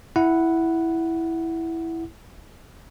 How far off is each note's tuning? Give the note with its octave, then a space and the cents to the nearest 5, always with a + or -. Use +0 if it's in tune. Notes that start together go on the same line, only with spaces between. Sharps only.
E4 +0 F#5 +0